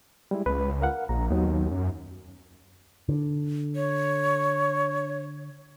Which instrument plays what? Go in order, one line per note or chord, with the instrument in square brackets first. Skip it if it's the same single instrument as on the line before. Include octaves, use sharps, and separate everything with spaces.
[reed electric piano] G3 G#3 E4
[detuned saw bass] C#2 [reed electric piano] G#3 B4
[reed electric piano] A#4 F5 F#5
[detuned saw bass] A#1 [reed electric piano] A#5
[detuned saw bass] D#2 [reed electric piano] F#3 B3 D#4
[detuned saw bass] F#2
[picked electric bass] D3
[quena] C#5